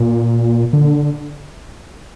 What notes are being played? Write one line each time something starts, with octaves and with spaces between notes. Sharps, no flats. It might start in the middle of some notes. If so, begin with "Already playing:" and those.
Already playing: A#2
D3